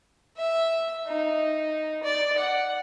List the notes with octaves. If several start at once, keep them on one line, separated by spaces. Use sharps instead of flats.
E5
D#4
D5
F#5